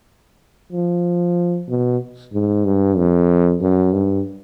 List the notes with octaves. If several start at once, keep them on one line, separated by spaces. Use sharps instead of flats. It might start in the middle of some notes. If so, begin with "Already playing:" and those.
F3
B2
G#2
G2
F2
F#2
G2